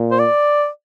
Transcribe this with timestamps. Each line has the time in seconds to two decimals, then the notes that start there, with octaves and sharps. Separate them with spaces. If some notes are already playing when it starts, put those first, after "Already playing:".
Already playing: A#2
0.11 C5
0.19 D5